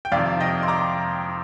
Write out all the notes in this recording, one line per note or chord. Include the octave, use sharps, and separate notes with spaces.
G5
F2 C3 D#3 D5 F5
D#5 G5
C6
A#5 D6